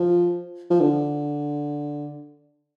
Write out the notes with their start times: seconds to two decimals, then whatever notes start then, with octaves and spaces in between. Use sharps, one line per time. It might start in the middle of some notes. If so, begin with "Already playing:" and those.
Already playing: F3
0.70 F3
0.80 D3